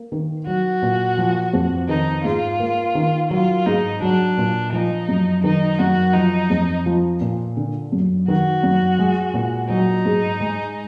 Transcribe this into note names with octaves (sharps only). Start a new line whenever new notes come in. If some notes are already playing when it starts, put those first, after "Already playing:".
Already playing: A#3
D#3
F#3 F#4
A#2
F3
F2
D#3 D#4
G#2 F4
A#3
D#3
F#3 F4
G#2 D#4
F#3 D4
A#2
F3 D#4
F#2
D#3 D#4
F#2 F#4
F3 D#4
F2
F3
A#2
D3
F#2
D#3 F#4
F#2
G#3
A#2
F#3 D#4
G#2
G#3